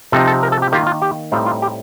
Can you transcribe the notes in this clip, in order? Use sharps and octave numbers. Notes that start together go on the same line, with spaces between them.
C3 F3 C4 D#4 A4
A4
A#4
A4
G4
D#3 A#3 F4 G4
F4
G4
A2 G3 C4 D#4 F4
F4
G4